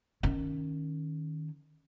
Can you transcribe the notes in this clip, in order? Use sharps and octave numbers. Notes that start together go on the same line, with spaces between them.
D#3 C#4